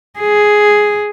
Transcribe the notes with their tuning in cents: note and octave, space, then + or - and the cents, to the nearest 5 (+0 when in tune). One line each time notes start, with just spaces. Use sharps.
G#4 +5